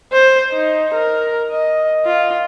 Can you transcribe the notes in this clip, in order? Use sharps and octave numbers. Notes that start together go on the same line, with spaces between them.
C5
D#4
A#4
D#5
F4